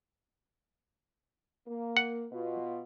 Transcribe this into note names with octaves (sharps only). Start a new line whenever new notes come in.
A#3
F#5
B2 F4